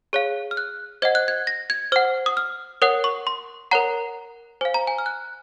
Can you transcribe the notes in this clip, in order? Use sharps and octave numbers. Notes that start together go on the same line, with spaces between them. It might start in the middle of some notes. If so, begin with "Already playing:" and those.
G#4 C#5 F5
F6
F#6
C5 D#5 F#5 G#6
F#6
G#6
A#6
G#6
C5 F#5 F6
D#6
F6
A#4 C#5 F#5 D#6
C#6
C6
A#4 C#5 F#5 A#5
C5 F5 G#5
A#5
G#5
F6
F#6